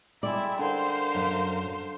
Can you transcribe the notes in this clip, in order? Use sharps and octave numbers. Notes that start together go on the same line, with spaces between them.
G3 G#3 E4 D5
D3 A4 A#4 C5 F5 B5
F#2